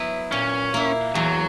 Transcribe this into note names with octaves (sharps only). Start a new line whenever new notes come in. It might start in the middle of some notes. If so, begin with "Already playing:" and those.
Already playing: F#3 B3 E4
A#2 C#4
A#3 E4
E2 F#3